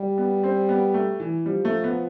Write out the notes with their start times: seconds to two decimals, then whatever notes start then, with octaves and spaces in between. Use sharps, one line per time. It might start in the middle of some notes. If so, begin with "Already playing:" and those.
Already playing: G3
0.18 B3
0.43 C4
0.69 B3
0.94 A3
1.20 E3
1.46 F3 G3
1.65 A3
1.84 B3